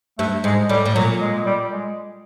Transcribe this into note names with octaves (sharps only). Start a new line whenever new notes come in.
G2 A3
G#2 G#3
A2 G3
A2
A#2 F#3
G#3
G3
G#3